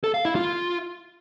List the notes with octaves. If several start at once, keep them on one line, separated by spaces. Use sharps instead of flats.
A4
F5
E4
F4